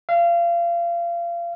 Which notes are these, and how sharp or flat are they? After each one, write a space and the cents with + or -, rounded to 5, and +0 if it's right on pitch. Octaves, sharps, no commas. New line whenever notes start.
F5 -30